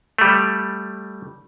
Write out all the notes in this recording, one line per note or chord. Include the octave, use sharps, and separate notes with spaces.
G3 A3